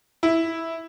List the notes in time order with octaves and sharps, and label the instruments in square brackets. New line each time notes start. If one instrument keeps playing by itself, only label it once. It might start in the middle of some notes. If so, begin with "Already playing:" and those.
[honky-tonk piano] E4